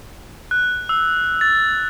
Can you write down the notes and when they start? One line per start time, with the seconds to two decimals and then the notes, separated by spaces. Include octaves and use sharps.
0.51 F#6
0.89 E6
1.41 A6